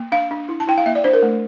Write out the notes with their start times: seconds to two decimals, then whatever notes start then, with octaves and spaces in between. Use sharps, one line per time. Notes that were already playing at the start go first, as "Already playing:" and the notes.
Already playing: A#3
0.12 D4 F5
0.31 D4
0.49 E4
0.60 A5
0.67 E4 G5
0.78 F5
0.86 A#3 E5
0.95 D5
1.04 D4 C5
1.13 A#4
1.23 A3